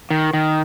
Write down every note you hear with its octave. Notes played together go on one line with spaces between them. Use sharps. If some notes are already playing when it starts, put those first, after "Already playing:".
D#3
D#3